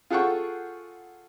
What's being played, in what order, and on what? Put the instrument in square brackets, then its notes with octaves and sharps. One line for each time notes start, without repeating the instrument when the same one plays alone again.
[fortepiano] F4 G#4 A4 F#5 G5 C#6